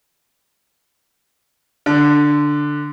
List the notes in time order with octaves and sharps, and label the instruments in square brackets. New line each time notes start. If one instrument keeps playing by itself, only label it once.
[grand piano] D3